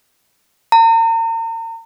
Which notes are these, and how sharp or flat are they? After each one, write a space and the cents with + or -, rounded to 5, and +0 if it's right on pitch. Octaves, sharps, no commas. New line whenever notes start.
A#5 -40